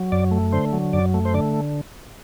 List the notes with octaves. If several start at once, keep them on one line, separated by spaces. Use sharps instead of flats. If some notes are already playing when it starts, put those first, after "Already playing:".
Already playing: F#3
F#2 D5
A3
D3 C5
F#3
F#2 D5
A3
C5
D3 D5